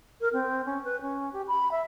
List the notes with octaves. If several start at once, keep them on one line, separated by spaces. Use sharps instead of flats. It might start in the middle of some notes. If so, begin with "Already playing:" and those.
A#4
C4
C#4
B4
C#4
G4
B5
E5